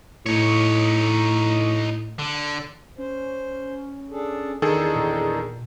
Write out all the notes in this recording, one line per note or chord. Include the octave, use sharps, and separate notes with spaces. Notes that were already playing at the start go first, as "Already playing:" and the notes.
A2 D#4 C#5
D3
C#4 C5
D4 G#4 A4
E2 D#3 D4 D#4 G#4 A4
A#2